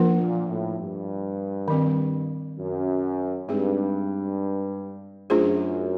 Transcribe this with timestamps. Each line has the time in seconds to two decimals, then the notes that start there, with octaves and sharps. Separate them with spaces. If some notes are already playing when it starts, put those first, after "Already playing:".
Already playing: F3 A#3 D4 F4 A#4
0.18 A#2
0.48 A2
0.78 G2
1.68 D#3 G3 C4
2.59 F#2
3.49 G2 G#3 C4 D#4 G#4
5.30 F#2 A3 D4 F4 G#4 C5